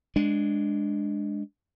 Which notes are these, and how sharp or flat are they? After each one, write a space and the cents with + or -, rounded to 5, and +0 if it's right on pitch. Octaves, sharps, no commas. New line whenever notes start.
G#3 +0 D4 +0